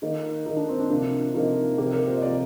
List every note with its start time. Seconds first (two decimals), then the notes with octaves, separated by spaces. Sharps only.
0.02 D#3 A#3 D#4
0.46 D#3 A#3 D#4
0.57 D4
0.69 C4
0.79 D4
0.90 C3 F3 A#3 D4
1.34 C3 F3 A#3 D#4
1.78 C3 F3 A#3 G4
1.93 A#4
2.07 C5
2.17 D#5
2.22 C3 F3 A#3 D5